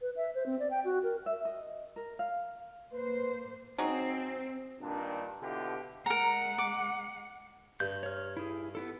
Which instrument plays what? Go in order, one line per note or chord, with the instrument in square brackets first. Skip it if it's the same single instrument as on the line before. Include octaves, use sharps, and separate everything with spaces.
[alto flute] B4
E5
C5
C4
D5
G5
F#4
A#4
[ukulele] E5
D#5
A#4
F5
[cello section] A#3 C5 [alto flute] B4
[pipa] F#3 D#4 G#4 [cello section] C4
[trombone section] G2 A#2 D#3 D4
B2 D3 E4 F4 G4
[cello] G#3 F#5 [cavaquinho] A#4 A#5
[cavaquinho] D6
[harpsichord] G2 [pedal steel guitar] G6
[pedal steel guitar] C#5 F6
E4 G#4
B3 E4 A4